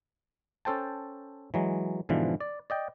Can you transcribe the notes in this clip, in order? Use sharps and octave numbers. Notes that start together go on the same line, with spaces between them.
C#4 A4 C5 G5 A5
E3 F#3 G#3
G#2 B2 D3 E3 F3
D5
D5 D#5 G5